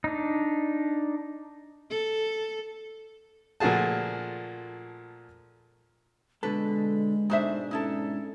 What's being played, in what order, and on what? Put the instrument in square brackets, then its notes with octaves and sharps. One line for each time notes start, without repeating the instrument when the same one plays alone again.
[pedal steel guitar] D4 D#4
[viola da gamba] A4
[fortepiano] A#2 F3 A3 F#4 G#4 A5
[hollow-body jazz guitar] B2 D3 A4 [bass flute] G#3 [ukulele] B4
[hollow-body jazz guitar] G#2 B2 D4 [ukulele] D#4 C5 E5
[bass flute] C#4 [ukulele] D#4 E4 A4